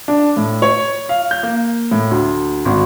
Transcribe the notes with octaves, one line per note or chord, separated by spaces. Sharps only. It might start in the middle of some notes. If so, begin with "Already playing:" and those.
D4
A2
C#5
F5
G6
A#3
A2
D2
G#1